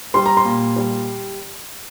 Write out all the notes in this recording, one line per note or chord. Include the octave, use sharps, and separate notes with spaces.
G3 C6
A#5
C6
A#2
G3